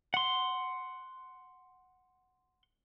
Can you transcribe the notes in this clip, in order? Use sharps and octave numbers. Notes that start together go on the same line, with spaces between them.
F#5 C6